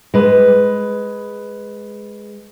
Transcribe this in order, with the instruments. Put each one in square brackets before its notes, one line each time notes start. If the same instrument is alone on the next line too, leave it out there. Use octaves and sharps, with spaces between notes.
[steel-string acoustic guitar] G#3 B4